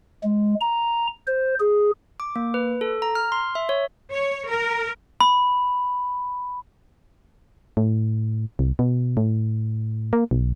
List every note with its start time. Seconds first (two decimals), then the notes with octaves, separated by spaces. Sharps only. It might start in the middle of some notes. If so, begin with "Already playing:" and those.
0.23 G#3
0.61 A#5
1.27 C5
1.60 G#4
2.20 D6
2.36 A#3
2.54 B4
2.81 A4
3.02 A#5
3.15 F6
3.32 C6
3.55 E5
3.69 C#5
4.11 C#5
4.49 A#4
5.21 B5
7.77 A2
8.59 C2
8.79 B2
9.17 A2
10.13 A#3
10.31 B1